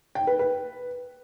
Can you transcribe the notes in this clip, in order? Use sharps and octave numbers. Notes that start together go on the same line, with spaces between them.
G5
B4
B4